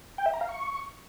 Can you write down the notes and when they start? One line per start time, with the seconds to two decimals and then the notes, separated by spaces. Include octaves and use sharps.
0.18 G5
0.26 E5
0.33 A#5
0.41 F5
0.49 C#6